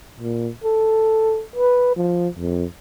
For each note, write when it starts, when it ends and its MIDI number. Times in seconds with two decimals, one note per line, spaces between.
0.20 0.50 46
0.64 1.42 69
1.56 1.94 71
1.96 2.28 53
2.39 2.65 41